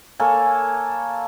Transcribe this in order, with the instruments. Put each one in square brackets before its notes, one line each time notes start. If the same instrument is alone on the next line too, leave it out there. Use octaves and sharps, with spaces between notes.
[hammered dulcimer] A#3 A4 C#5 G#5